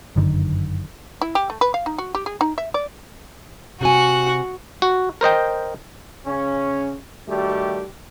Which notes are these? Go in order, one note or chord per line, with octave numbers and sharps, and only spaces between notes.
G1 F#2 D3 D#3
E4
G4
A3
B4
F5
D#4
F#4
G4
G#4
D#4
E5
D5
C3 F#4 F#5 G#5
F#4
A#4 C5 D#5 G5
C#3 C#4
D#3 G3 A3 F#4 G4